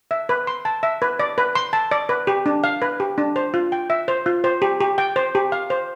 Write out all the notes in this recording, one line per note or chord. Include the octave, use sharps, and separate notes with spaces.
E5
B4
C6
A5
E5
B4
D5
B4
C6
A5
D5
B4
G4
D4
F5
B4
G4
D4
C5
F4
G5
E5
C5
F4
C5
G4
G4
G5
C5
G4
F5
C5